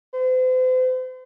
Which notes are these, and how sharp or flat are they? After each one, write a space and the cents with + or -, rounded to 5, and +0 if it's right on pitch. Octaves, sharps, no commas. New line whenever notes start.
C5 -40